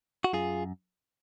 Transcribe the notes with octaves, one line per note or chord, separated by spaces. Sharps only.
F#4
F#2 F4 G#4